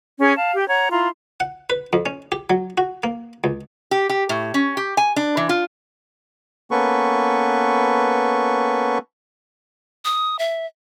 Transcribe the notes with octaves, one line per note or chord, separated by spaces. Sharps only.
C#4 G#4 G#5
F5 A5
G4 G5
C#5 F#5 A#5
E4 F4 A#5 C6
F#5
B4
F2
C#4
G4
F#3
F#4
A#3
C#2
G4
G4
A2
C#4
G4
G#5
D4
E3
F4
A#3 B3 C#4 A4 B4 C#6
D#6
E5